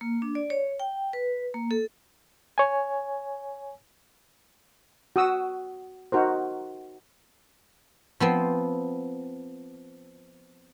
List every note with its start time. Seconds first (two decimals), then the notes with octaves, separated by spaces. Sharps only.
0.01 A#3
0.22 D4
0.35 D5
0.50 C#5
0.80 G5
1.13 B4
1.54 A#3
1.71 A4
2.58 C#5 G#5
5.16 F#4 D#6 E6
6.12 D#4 F#4 A#4 C5
8.20 F3 B3 C4